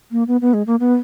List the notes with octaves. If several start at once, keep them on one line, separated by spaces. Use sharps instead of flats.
A#3
B3
B3
G#3
A#3
B3